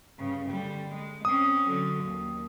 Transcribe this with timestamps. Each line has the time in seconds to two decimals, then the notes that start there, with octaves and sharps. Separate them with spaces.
0.19 G2 C#3
0.49 D3 G3
0.95 G#3
1.25 C4 C#4 D#6
1.67 D3 F#3
2.05 D#2